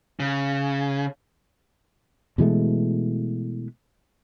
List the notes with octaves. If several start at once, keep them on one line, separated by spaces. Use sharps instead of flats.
C#3
B2 E3 G#3 A3